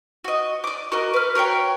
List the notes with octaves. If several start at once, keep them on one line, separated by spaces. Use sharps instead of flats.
F#4 D#5
D5 D6
F#4 A#4 D#5
B4 F6
F#4 A#4 C#5 G5